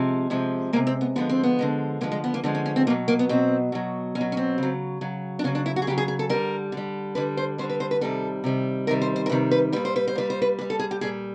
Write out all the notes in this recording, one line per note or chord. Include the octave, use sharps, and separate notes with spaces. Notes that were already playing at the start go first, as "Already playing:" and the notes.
Already playing: C3 F3 G#3
C3 F3 G#3
C3 F3 G#3 A#3
C4
B3
D3 F3 G#3 B3
C4
B3
D3 F3 G#3
D3 F3 G#3 A#3
G#3
B3
A#3
D3 F3 G#3
C#4
C#4
C4
B2 F#3 A#3
A#3
B3
B2 F#3 C4
B2 F#3
B2 C#4
F#3
C#4
C4
C#3 F#3
C#3 F#3
D4
C#3 F#3 C#4
D4
E4
F#4
G#4
C#3 F#3 G4
G#4
G#4
A4
D3 G3 A#4
D3 G3
D3 G3 B4
C5
D3 G3 C5
B4
C5
B4
C3 D#3 G3 A4
C3 D#3 G3
C3 D#3 G3 A#4
C5
C5
A#4
C3 D#3 G3 B4
B4
A#2 G3 B4
C5
B4
C5
A#2 G3 B4
C5
B4
A#2 G3 B4
A4
G#4
G4
A#2 G3 G#4